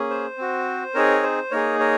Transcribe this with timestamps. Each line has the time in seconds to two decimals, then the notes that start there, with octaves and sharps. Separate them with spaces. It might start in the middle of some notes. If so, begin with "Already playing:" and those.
Already playing: A#3 C#4 G#4
0.10 C5
0.38 C4 F#4
0.94 C4 D#4 G#4 A#4 C#5
1.23 C5
1.51 A#3 D#4 G#4 A#4 C#5
1.79 A#4 C#5